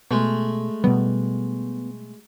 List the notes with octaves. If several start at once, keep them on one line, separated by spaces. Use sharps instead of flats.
B2 G#3 A3
B2 G3 B3